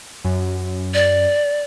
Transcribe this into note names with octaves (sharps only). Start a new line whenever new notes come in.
F#2
D5